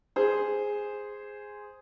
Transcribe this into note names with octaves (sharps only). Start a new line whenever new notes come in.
G#4 C5